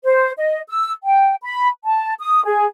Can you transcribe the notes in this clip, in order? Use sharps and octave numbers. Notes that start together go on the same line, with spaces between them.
C5
D#5
E6
G5
B5
A5
D#6
G#4